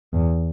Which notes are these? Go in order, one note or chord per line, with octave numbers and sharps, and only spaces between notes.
E2